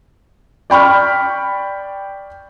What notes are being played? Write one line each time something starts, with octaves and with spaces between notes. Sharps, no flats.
D5 G5 B5 C#6 F6